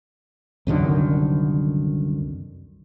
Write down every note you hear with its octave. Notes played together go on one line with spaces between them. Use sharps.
C2 F#2 D3 D#3